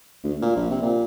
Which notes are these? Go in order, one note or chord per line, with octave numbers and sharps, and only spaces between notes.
D2
A#2
A#1
C3
A#2